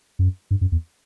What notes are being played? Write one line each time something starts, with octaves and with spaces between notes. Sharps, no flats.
F#2
G2
F#2
E2